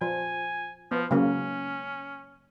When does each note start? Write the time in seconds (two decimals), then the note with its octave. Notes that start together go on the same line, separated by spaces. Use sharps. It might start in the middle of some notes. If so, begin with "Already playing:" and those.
0.01 F3 G#5
0.91 F3 B3
1.11 C#3 F#3 A#3 C#4